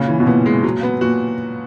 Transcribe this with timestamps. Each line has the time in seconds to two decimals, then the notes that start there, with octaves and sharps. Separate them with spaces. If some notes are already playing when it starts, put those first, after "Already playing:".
Already playing: A#2 C#3 C#4
0.08 E3
0.20 B2
0.26 A#2 B3
0.46 G#3
0.64 F#3
0.83 B3
1.01 A#2 F#4